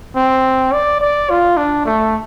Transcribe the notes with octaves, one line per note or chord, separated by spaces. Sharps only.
C4
D5
D5
F4
D4
A3